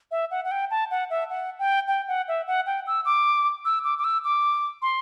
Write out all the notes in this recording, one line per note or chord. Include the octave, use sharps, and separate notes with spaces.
E5
F#5
F#5
G5
A5
F#5
E5
F#5
G5
G5
F#5
E5
F#5
G5
E6
D6
E6
D6
D6
E6
D6
C6